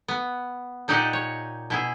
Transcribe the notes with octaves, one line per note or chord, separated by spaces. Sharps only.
B3
A#2 D#4 G4 D5 D#5 F#5
C#5
B2 E4 G#4